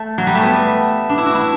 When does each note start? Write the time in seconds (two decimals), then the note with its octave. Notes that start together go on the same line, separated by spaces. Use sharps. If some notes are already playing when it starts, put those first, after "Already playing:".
Already playing: A3
0.18 F#3
0.27 G3
0.35 A3
0.43 B3
1.09 D4
1.18 E4
1.26 F#4
1.35 E4